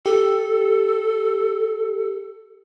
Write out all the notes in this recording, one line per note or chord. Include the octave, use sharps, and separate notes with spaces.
G4 A4